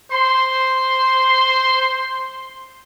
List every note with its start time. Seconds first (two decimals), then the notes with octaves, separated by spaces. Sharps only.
0.12 C5 C6